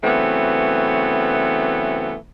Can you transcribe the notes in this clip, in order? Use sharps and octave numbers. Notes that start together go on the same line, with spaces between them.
C#3 E3 F#3 A3 B3 C4